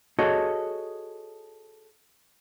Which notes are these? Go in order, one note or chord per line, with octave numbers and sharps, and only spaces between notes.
F#4 G#4 A4 C#5 D#5